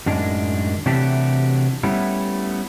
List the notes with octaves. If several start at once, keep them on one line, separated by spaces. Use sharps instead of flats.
F#2 A2 D#3 G#3 D4
C3 E3 F#3 A3 D4 G4
G3 A3 B3 C#4 E4